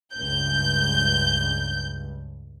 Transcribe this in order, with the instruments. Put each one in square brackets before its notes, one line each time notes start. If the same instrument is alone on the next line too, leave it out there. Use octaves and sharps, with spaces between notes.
[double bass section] C#2 G2 [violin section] G6